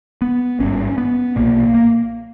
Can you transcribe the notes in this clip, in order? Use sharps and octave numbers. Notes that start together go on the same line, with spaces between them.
B3
G#1 G2 C#4
B3
B1 A#2 A#3
A#3